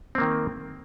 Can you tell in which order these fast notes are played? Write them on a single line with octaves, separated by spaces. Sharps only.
C4 A#3 D#3